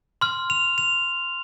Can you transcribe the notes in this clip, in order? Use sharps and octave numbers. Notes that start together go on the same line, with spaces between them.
C6 F6
F7
F7